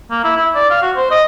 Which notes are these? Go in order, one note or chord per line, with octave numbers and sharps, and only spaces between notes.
A#3
E4
E4
D5
F5
F#4
C5
D#5